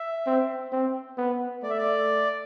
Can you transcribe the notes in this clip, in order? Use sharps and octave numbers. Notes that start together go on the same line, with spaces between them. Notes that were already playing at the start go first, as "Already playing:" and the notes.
Already playing: E5
C4
C4
B3
A3 D5
E5
D5